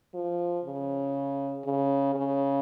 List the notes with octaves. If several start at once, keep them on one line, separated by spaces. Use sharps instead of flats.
F3
C#3
C#3
C#3